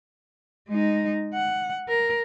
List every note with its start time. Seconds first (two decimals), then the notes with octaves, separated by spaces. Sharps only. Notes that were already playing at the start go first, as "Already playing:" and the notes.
0.69 G#3 D#4
1.34 F#5
1.88 A#4